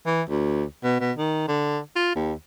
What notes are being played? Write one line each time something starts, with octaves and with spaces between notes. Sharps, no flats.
E3
D2
B2
B2
D#3
D3
F4
D#2